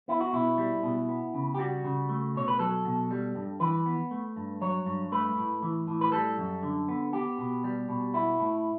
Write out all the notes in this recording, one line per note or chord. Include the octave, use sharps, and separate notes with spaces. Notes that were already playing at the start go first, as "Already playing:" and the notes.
B3 E4
F#4
B2 E4
G3
B2
B3
C#3
G4
G3 F#4
C#3
A3
B2 C#5
B4
F#3 A4
B2
G3
G2
E3 B4
B3
A3
G2
F#3 C#5
G2
A3 B4
A2
E3
A2
B4
G3 A4
F#2
D3
B3
B3 G4
B2
G3
B2
B3 E4
A2